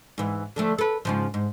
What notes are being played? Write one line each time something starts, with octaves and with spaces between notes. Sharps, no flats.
G#2 E3
D3 F3 A3
A4 B4
G#2 C#3 F3
G#2